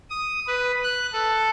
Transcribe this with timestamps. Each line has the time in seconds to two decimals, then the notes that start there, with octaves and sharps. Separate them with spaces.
0.10 D#6
0.47 B4
0.84 F#6
1.13 A4